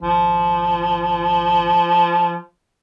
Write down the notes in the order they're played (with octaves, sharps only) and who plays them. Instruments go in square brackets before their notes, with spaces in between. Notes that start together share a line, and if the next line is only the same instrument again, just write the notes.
[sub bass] G#1 [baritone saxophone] F3